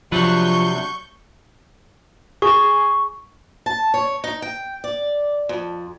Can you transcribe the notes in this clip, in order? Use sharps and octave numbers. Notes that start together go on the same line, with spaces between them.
C3 F3 F#3 D4 B4 C#6 G6
G#4 C#6
A5
C#5
D#4
G5
D5
F2